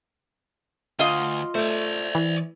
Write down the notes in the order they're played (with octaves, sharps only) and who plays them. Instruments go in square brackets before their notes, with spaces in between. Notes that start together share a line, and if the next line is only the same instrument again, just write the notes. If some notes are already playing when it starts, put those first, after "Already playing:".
[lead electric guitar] D2 [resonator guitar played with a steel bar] F4 D#5
[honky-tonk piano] A3 [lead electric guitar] C5 D5
[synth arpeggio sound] E3